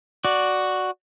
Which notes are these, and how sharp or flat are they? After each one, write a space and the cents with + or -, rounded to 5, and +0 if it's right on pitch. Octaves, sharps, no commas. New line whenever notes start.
F#4 +0 D5 +0